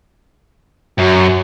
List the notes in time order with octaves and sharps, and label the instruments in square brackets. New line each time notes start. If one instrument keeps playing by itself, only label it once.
[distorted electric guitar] F#2 [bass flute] F#4